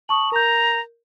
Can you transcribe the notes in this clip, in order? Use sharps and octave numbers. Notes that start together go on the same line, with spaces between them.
A5 C#6 D#6 F#7
A#4 A#5 G6